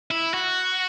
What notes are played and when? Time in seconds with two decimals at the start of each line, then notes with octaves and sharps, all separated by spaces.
0.11 E4
0.34 F#4